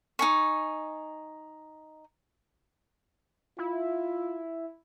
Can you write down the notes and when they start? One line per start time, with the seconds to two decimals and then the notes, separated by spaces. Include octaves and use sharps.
0.19 D#4 G#5 C#6
3.58 E4 F4